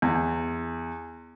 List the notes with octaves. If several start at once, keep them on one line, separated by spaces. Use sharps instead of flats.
E2